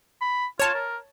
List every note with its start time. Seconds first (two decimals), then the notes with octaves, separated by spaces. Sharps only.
0.21 B5
0.60 F4 C#5 A5
0.74 A#4